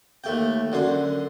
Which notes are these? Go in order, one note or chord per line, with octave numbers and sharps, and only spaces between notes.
D#2 A3 G5
F#2 D3 C6